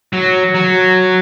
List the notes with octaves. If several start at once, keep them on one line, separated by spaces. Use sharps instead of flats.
F#3
F#3